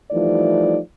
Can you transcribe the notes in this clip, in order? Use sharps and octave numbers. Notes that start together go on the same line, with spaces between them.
E3 F3 G3 A3 D#4 D5